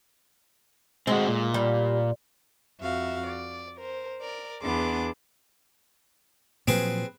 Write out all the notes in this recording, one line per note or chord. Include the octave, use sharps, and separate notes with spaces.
G#3 C4 F#4
A#2
G3
F2 F#4 E5 F5
D5
A#4 C5
A#4 D5
E2 B3 D4 G#4 C6 D6
A#2 F3 F#3 C4 G#4 B4